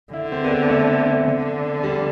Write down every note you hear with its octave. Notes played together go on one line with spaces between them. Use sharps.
D3 E4
C4
B3
C4
A3
D3
G3